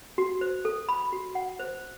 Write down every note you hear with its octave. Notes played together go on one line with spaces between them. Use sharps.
F#4
C5
A4
B5
F#4
F#5
C5